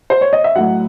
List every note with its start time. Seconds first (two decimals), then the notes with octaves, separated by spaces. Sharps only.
0.10 C5
0.21 C#5
0.33 D#5
0.44 E5
0.55 A2 F#3 F#5